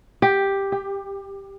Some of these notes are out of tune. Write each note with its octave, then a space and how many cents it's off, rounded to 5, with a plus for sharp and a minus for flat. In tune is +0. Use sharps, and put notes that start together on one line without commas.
G4 +5
G4 +25